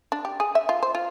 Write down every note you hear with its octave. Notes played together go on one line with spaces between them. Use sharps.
D4
G4
G#4
E5
F4
C5
F4